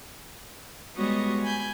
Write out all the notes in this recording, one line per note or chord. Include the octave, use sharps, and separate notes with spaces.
G3 G#3 B3 F#4 C#5 D#5
G#5 B5 G6